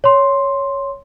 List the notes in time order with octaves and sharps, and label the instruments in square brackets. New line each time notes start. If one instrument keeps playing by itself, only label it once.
[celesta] C#5 C6